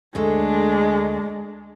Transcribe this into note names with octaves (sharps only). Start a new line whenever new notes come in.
D2 G#3 A3 D4